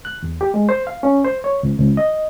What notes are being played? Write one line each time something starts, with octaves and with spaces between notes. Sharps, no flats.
F#6
E2
G4
G#3
C5
F5
C#4
C5
C#5
C#2
C#2
D#5